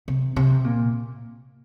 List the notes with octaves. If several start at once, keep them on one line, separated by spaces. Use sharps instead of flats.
C3
C3
A#2